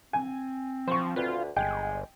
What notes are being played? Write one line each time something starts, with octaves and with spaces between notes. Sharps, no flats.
C4 G#5
F3 C5 C#6
D2 F4 B4
G1 G#3 G5